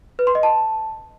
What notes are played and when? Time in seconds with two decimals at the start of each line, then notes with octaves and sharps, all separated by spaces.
0.19 B4
0.27 C6
0.35 D#5
0.43 A5